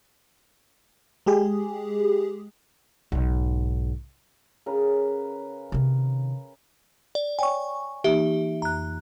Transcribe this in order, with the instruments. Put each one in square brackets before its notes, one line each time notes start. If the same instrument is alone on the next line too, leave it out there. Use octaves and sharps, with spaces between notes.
[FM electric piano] G#3 G4 G#4
[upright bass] B1 G#2
[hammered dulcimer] C#3 A#4 B4
[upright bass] C3 D#3
[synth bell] D5
[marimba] C#5 D5 G5 [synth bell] G#5 C#6
[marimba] E3 A#3 D#4 [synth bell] G4 E5
[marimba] F2 [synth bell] A#5 F#6